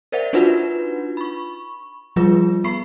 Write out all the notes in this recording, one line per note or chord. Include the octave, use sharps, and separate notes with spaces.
A#4 C5 D5 E5 F#5
D4 D#4 F4 F#4 B4 F#5
B5 C#6
F3 G3 F4 G#4 B4
B3 B5 C#6 C7